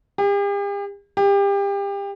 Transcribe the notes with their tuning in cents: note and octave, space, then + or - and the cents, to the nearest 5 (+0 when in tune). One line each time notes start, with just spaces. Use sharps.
G4 +45
G4 +30